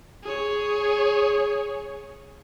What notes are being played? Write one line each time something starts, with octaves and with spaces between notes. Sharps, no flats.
G#4 C#5